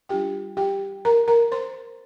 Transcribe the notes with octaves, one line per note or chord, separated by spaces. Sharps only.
G3 D4 F4 G4 G5
G4 G5
A#4 A#5
A#4 A#5
C5 C6